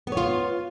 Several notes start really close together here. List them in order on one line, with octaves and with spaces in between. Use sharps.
B3 C#5 F4